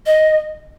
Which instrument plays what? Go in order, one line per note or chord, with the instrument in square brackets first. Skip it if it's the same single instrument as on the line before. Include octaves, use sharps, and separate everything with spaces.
[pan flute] D#5